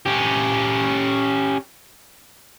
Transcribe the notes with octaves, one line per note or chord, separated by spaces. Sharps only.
C#4 G4